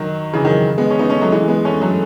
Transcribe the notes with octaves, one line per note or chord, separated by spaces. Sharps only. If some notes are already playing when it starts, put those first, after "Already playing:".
Already playing: D#3 F#3
C#3 E3
D#3 F#3
G#3 B3
C#4
B3 D#4
A3 C#4
F#3 A3
E3 G#3
G#3 B3
A3 C#4
F#3 A3